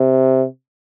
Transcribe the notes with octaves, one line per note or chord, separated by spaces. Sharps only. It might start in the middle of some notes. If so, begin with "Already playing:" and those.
Already playing: C3